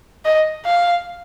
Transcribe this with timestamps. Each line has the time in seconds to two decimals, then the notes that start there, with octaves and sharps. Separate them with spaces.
0.25 D#5
0.66 F5